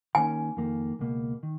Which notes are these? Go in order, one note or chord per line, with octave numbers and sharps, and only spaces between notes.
D#3 A#3 C#4 G#5
F2 D#3 A#3
C#2 B2 A#3
D#3